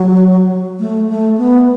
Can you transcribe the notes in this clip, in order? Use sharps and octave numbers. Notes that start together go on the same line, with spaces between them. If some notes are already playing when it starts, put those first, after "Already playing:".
Already playing: F#3
A3
A3
B3